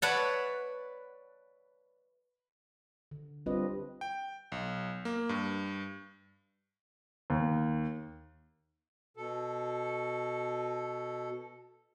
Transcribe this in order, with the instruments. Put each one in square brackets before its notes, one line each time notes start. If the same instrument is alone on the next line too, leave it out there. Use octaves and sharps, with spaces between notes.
[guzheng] B4 C#5 D5 E5 F#5 A5
[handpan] D3
G3 C4 D4 F4 B4 D#5
[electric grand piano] G5
B1
A#3
G2
[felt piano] D#2
[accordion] B2 A4